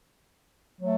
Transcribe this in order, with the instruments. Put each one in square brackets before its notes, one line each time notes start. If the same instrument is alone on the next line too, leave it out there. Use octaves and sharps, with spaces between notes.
[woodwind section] F#3 A3